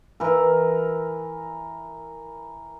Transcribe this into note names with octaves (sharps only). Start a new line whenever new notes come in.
E3 A#4